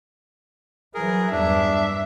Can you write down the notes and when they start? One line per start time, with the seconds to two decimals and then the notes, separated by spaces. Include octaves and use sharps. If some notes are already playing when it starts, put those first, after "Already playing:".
0.94 E3 F#3 G#4 A#4
1.31 E2 G2 D4 E5